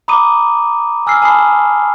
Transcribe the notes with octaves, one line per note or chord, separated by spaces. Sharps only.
A#5 B5 D6 D#6 D#7
G#5 E6 F6 C7
G#5 A5 B5 D#6 C7